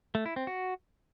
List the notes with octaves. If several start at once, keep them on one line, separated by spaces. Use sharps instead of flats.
A3
E4
C4
F#4